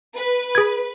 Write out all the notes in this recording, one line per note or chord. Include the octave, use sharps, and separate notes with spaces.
B4
G#4 G#6